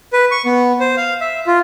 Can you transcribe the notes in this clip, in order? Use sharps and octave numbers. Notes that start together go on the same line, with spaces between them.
B4
C#6
B3
C5
F5
E5
F4